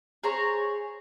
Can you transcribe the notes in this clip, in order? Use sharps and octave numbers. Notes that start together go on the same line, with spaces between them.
G#4 C5 C#5 A#5